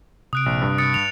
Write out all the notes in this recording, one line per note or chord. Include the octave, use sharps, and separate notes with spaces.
C3 D#6 F#6 D7
A#1
G2
D#6 A6 C#7
F7